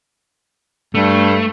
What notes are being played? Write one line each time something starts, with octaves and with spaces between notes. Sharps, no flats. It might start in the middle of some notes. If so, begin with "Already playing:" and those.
G2 A3